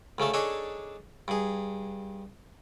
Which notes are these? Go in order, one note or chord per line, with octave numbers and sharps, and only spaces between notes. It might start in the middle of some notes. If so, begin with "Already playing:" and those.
D2 C#3 A3 A4
D4 D#4 G#4 A4 C#5
G2 G#4